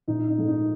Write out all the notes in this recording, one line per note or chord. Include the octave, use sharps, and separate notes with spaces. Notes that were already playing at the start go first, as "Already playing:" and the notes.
A#1 D#4
D#4
G#2 F3 A3
D#4